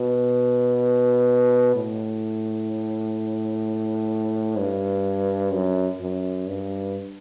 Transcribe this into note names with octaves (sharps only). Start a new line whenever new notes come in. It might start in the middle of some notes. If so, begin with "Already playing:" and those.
Already playing: B2
A2
G2
F#2
F#2
G2